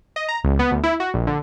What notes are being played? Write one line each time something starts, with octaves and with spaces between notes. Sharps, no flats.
D#5
A#5
C#2
B3
D2
E4
F#4
A#1
D3